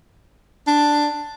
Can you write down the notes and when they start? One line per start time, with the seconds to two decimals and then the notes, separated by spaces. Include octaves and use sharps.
0.67 D4